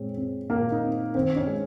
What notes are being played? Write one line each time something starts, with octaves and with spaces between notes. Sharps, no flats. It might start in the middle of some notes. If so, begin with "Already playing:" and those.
Already playing: A#2 G#3 C4 C#5
C4
A#2 A#3 A#4
D#4
C4
D#3 C4 C5
C#4 C#5
G#3